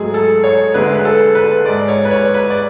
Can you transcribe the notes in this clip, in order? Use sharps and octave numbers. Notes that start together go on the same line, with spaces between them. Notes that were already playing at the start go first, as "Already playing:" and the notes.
Already playing: G#2 F#3 A3 G#4
A4
C#5
D2 D3 G#3 B4
B4
A4
B4
G#2 G#3 D5
C#5
B4
C#5
B4
D5